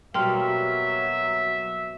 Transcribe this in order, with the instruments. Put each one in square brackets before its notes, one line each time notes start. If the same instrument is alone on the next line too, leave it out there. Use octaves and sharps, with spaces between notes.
[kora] B2 G3 A#3 [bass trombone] F#3 [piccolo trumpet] E5 [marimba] G5 C6 F6